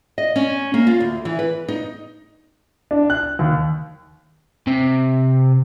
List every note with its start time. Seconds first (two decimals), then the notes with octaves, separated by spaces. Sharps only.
0.18 D#5
0.36 C#4
0.74 A#3
0.87 F4
1.00 D2
1.25 E3
1.39 B4
1.68 D#4
2.91 D4
3.10 F#6
3.39 D#2
4.67 C3